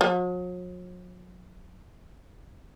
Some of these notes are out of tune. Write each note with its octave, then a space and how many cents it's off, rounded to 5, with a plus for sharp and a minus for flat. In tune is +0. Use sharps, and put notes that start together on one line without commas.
F#3 -45